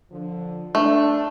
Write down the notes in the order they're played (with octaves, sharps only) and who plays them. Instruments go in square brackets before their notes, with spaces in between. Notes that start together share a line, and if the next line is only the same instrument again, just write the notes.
[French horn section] D3 F3
[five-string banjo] A3 [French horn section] D4